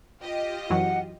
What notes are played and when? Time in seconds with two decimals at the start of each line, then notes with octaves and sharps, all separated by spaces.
0.22 F4 G4 D#5
0.70 F#2 E3 F#3 F#5